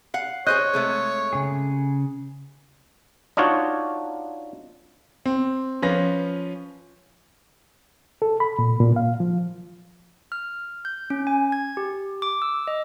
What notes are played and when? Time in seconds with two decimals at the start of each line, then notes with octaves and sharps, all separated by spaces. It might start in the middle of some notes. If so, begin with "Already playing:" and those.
0.14 F5 F#5
0.47 G#4 C5 C#5 D#5 F#6 G6 A#6
0.74 C3 G#3 A3
1.33 C#3 G#4
3.37 D4 D#4 F4 F#4 C#5
5.26 C4
5.82 F3 C#4 F4 B4 A#6
8.22 A4
8.40 B5
8.59 A#2
8.80 A#2
8.96 F5
9.20 F3
10.32 F6
10.85 G6
11.10 C#4
11.27 G#5
11.52 G#6
11.77 G4
12.22 D6
12.42 E6
12.67 D#5